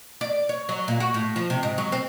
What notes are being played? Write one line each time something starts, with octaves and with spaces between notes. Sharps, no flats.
D5
C#5
F#3
A#2
F#4
A2
F3
C3
G#2
F#3
C4